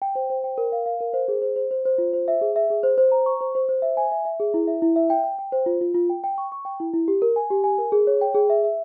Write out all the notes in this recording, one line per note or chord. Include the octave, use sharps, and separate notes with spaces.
G5
C5
C5
G5
A#4
F5
F5
A#4
C5
G#4
C5
C5
C5
C5
F4
C5
E5
G#4
E5
G#4
C5
C5
A#5
C#6
C5
C5
C5
E5
G#5
E5
E5
G#4
E4
E5
E4
E5
G5
G5
G5
C5
F4
F4
F4
G5
G5
C#6
C#6
G5
E4
E4
G4
A#4
G#5
G4
G#5
A#4
G#4
C#5
G5
G#4
E5
E5